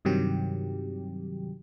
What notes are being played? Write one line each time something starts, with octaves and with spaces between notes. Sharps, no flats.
G2 C3 D#3 F#3 G4